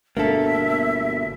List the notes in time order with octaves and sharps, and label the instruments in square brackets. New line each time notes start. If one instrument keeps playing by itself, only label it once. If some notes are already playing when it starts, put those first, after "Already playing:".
[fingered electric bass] G1 B2 D4 [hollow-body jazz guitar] A#3 A4 [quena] E5